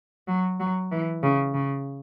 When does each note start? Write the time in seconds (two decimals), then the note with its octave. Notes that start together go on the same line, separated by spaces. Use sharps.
0.27 F#3
0.60 F#3
0.91 E3
1.23 C#3
1.54 C#3